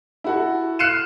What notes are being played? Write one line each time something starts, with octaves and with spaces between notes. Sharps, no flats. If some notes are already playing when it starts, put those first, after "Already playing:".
E4 F#4 A4
F6 F#6 C7 C#7 D#7 E7